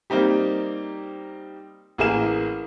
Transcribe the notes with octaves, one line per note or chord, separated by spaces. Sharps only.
G3 A#3 C4 D#4 G4
A1 A#3 E4 G#4 A#4 E7